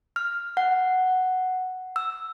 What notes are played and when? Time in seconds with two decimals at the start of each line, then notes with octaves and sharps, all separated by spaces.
0.16 F6
0.57 F#5
1.96 E6